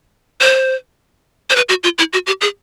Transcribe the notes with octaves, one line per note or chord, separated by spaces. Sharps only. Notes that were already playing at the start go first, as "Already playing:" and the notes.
C5
C5
B4
F#4
F4
E4
F#4
G4
G#4